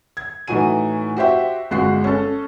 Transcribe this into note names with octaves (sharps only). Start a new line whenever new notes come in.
G#6
A2 E3 D#4 F#4 G#5 D#7
F#4 G4 C5 E5
G1 G#3 F#4 F#6 C7
C#4 A4